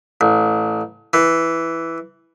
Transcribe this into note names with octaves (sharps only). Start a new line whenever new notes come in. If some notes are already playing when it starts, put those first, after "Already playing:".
A1
E3